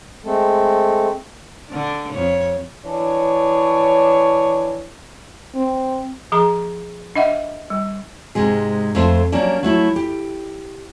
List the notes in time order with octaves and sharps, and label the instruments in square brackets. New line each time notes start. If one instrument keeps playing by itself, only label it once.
[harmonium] G#3 A3 C4 A4
[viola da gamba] D3 D4
F2 C#5
[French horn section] E3 D4 C#5
C4
[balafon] F3 G#4 A#5
D4 D#5 E5 F#5
G3
[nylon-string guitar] G#2 C3 G#3 G#4
F2 A3 C5 A5
F#3 G3 A#3 C#4 D4
F#3 A3 E4
G4